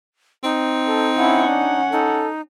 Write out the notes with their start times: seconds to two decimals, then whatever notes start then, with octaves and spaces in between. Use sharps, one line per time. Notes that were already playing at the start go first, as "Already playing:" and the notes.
0.44 C4 D#4
0.87 A4
1.17 C#4 E4 F#5
1.48 D4
1.92 D#4 A4